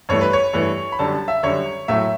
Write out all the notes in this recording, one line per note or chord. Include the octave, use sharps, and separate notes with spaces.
G2 E3 A3 C#5
B4
C#5
G2 E3 A3
B5
F#2 D3 G3 A5
A5
E5
F#2 D3 G3 C#5
A2 F#3 A3 E5